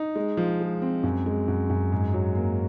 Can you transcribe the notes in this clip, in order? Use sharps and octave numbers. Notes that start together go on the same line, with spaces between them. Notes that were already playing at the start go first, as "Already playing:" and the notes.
Already playing: D#4
G#3
F3
G#3
C4
F#2
G#3
F#2
F#2
G#2
F#3
A#3